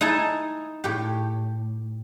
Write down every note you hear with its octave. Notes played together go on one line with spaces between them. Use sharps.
D#4 E4 G#5 A5
A2 G4